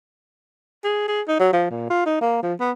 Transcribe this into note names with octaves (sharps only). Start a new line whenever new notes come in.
G#4
G#4
D#4
F#3
F3
A#2
F4
D#4
A#3
F3
B3